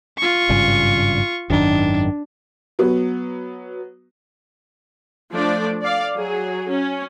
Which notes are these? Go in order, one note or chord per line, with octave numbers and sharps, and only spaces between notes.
F4 C#6
G#1 G2 C#3
G#1 F#2 D#3 D4
F#3 B3
F3 A3 D4 D5
D5 F5
F#3 G#4
C#4